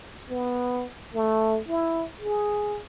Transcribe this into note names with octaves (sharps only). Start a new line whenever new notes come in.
B3
A3
E4
G#4